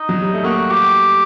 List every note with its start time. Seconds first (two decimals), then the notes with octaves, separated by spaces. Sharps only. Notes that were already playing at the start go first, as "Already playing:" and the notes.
Already playing: D#4
0.09 F#3
0.22 G3
0.33 A3
0.45 A#3 F#4
0.71 G4